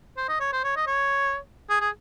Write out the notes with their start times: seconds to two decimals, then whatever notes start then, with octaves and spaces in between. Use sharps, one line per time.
0.17 C5
0.29 D#5
0.40 C#5
0.52 C5
0.64 C#5
0.76 D#5
0.87 C#5
1.70 G#4
1.81 G#4